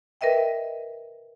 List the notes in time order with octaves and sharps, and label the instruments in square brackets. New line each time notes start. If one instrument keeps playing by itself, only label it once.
[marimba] A#4 B4 D#5 E5 G5